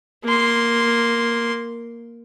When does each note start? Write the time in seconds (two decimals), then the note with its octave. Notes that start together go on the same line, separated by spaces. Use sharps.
0.25 A#3 C6